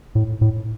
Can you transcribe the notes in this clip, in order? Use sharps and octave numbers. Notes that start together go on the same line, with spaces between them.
A2
A2